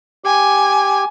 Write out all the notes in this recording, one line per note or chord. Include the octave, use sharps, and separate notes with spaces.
G4 G#5